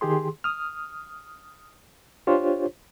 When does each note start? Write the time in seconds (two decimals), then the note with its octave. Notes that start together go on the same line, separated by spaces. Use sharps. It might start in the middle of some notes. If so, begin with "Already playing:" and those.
0.01 D#3 G4 G#4 C6
0.44 D#6 F6
2.27 D4 F4 G4 C5 C#5